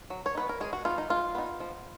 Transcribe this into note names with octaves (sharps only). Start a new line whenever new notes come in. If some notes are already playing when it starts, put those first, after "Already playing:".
F#3
C#5
B3 D#4 B4
A#4
G#3 G#4
F#4
B3 D#4 F4
D#4
G#3 F4
B3 D#4
F3